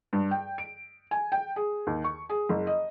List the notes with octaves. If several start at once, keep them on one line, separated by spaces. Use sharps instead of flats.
G2
G5
D7
G#5
G5
G#4
D#2
C#6
G#4
F#1
D#5